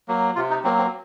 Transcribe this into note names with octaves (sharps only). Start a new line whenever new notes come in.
F#3 A#3
C3 F4
D#4
F#3 A#3 C4
C4